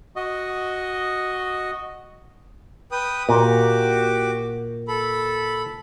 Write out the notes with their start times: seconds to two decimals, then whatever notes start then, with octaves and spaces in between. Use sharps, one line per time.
0.16 F#4 D#5
2.92 B4 G5 D#6
3.29 A#2 F#4 G4 D6
4.88 A4 B5